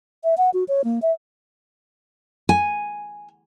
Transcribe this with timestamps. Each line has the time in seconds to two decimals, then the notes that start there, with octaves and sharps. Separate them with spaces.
0.24 E5
0.38 F#5
0.54 F#4
0.68 C#5
0.84 A#3
1.02 E5
2.49 G#5